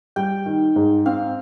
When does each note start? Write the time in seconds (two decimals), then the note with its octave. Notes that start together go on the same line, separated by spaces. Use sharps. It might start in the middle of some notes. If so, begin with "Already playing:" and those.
0.16 G3 G5
0.46 D#3
0.76 G#2
1.06 C4 F5